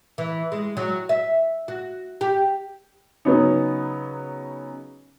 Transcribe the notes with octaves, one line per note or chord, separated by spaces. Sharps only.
E3
G#3
F#3
E5
F#4
G4
C#3 F#3 B3 C#4 D#4